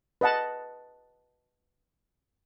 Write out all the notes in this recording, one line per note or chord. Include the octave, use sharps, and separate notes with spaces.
B4 D#5 F#5 A5